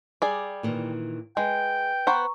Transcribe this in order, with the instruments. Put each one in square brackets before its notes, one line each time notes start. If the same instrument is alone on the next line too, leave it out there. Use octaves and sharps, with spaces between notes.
[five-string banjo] G3 G#4 D5
[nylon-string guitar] A#2 D#3 E3
[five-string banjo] G#3 [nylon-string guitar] B4 [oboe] G5
[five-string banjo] B3 C5 F#5 [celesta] A#5 C#6